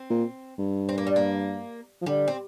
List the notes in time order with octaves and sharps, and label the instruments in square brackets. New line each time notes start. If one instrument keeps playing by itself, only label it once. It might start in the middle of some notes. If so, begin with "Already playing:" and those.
Already playing: [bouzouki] C4
[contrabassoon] A#2
G2
[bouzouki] C4
A#3
G3
A#3
[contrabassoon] F3
[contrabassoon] D3 [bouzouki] G3
[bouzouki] C4